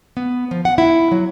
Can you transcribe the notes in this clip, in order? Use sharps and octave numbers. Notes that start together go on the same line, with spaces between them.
B3
F3
F#5
E4
F#3